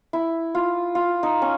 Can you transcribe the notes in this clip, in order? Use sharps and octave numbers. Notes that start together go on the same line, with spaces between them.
E4
F4
F4
D#4
C#4